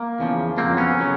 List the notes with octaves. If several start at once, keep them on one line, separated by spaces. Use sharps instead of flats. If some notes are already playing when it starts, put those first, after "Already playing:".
Already playing: A#3
E2 C#3 F3
F2 C#3 F#3 A#3 C4
B3 C#4
C#3 F#3